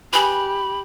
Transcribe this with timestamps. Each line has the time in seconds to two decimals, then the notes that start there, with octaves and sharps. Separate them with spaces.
0.13 G4 G#4 B4 B5